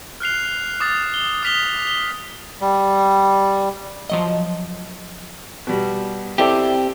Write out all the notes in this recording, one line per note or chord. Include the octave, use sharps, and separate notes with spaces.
F6 F#6 C7 F7
D6 D#6 A6
G7
D#6 F6 B6 F7 G7
G7
G3
F3 F#3 D#5
B2 G3
C4 E4 G4 A4 D5